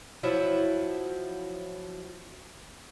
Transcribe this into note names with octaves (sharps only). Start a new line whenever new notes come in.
F3 F#3 E4